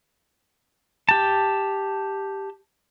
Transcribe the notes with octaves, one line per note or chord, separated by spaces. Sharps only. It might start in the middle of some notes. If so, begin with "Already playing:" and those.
G4 A5